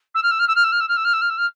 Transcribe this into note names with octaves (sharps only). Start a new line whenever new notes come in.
E6
F6
E6
F6
E6
F6
E6
F6
E6
F6
E6
F6
E6
F6
E6
F6